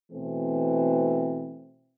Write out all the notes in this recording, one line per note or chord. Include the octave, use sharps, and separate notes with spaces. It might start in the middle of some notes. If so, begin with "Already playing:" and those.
B2 E3 A3 C4